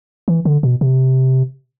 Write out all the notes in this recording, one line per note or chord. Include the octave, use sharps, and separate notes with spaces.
E3
D3
B2
C3